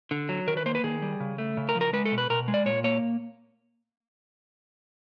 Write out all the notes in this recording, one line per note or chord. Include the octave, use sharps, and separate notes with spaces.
D3
F#3
D#3 A#4
B4
A#3 C5
B4
D#3 G#4
G3
C#3
A3
C#3
A#4
F3
A#4
G#3 B4
A4
B2
B4
B2 A#4
G#3
D5
A#2 C#5
A#3 C#5